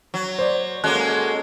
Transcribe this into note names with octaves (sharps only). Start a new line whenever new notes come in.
F#3
C5 D5
G#3 A#3 C#4 F#4 A4 F#6